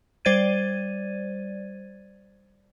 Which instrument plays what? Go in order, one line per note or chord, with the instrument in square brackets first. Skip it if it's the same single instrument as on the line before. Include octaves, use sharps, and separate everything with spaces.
[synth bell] G3 C5 D5 G#6 A6 D#7